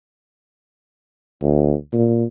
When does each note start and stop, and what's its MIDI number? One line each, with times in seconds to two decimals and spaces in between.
1.42 1.74 38
1.93 2.24 46